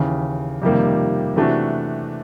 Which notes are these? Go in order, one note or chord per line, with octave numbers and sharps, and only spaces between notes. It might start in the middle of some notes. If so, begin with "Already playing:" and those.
Already playing: D#2 C#3 E3
F2 C3 D#3 G3 A#3
C3 E3 A3 D4 F#4